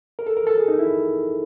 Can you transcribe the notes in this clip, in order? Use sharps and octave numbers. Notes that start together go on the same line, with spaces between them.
A#4
A4
A#4
A4
G#4
D#4
E4